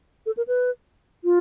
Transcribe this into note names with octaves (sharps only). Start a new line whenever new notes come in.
A4
A#4
B4
F4